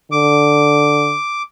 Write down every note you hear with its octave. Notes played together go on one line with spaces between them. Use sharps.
D3 D6